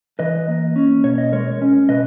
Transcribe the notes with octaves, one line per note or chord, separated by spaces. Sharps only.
E3 B4 D#5
A#3
C#4
B2 C#5
D#5
G#3 A#4 C#5
C#4
B2 B4 D#5